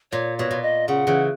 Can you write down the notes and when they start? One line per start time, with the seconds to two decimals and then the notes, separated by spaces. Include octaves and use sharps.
0.11 A#2 C#5
0.38 B2 C#5
0.51 A#2
0.62 D#5
0.88 C#3 F#5
1.07 C#3 E3